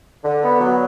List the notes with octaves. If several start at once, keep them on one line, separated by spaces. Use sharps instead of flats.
D3
B3
F#3